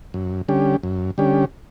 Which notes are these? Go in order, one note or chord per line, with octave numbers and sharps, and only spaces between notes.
F#2
D3 G3 C#4 G4
F#2
D3 G3 C#4 G4